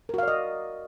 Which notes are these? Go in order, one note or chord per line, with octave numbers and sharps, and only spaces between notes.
F#4 A#4 D5 D#5 F5